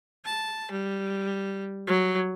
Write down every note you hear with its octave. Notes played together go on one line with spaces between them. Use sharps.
A5
G3
F#3